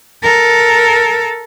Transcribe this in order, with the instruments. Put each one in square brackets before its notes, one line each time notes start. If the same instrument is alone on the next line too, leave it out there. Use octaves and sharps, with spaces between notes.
[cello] A4 A#4